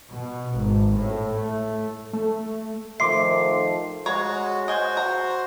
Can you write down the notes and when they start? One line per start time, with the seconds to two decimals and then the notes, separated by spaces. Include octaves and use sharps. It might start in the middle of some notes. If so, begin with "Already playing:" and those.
0.11 B2
0.57 G#1
0.97 A2
1.34 A3
2.13 A3
3.00 D#3 F3 A3 E5 C6 D6 C7
4.06 G#3 F#4 C#5 A#5
4.68 F#4 C5 D#5 G#5
4.97 A#5